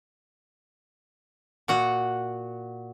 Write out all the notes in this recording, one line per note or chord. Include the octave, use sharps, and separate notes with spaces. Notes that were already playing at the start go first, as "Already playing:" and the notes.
A#2 F#4 F#5